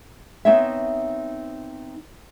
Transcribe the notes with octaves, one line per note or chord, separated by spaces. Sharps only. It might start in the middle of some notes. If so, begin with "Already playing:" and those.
B3 C4 D#4 C#5 E5